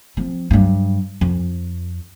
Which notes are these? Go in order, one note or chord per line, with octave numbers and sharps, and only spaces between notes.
F3 C4
G2 F#3
F2